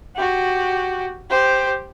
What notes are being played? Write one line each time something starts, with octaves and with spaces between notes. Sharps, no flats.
F#4 G4
G4 C5